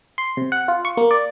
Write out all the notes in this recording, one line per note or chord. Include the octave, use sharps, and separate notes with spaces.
C6
C3
F#5
F4
C#6
A#3
D5